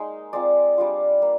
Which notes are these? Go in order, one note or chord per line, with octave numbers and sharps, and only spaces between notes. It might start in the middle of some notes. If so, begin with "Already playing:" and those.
Already playing: G#3 A#3 D#4
G#3 C4 F4 D5
G3 D4 F4
A#3